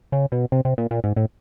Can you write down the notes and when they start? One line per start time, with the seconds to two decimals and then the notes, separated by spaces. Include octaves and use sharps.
0.12 C#3
0.32 B2
0.52 C3
0.65 C3
0.78 A#2
0.91 A#2
1.04 G#2
1.16 A2